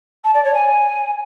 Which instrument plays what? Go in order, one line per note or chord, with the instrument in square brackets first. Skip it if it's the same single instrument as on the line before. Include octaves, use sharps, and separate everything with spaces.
[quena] A5
D5
C#5
G#5